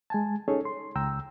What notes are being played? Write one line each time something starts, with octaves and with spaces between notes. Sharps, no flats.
G#3 G#5 A5
C#4 D#4 G#4 A4 C#5
C6
C#2 G5 A#5 E6